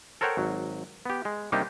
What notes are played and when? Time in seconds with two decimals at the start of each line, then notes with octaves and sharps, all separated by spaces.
0.21 A4 A#4 C5 C#5 F#5 G5
0.37 G#1 F#3
1.06 B3 G4
1.25 G#3
1.52 C3 G3 A#3 D4 D#4 G4